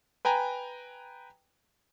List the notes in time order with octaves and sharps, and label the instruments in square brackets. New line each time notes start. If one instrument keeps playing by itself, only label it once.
[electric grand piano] B4 G5 G#5 A#5